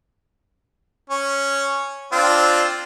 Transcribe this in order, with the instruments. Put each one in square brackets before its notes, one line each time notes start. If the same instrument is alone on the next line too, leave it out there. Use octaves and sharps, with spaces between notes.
[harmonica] C#4
C4 D4 F4